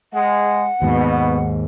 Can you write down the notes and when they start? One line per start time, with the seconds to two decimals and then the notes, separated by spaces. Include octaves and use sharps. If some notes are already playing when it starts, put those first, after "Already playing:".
0.13 G#3 F#5
0.82 D#2 G#2 B2 B3